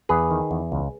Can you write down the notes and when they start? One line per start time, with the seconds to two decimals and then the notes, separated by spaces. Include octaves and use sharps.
0.09 E2 G#4 B4
0.31 D#3
0.51 E2
0.72 C#2